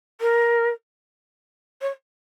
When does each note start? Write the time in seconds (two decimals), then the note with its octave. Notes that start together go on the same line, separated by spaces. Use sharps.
0.21 A#4
1.81 C#5